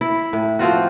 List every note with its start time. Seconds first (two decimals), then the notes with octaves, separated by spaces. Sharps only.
0.01 E4
0.33 A2
0.59 F3 C4 F4 F#4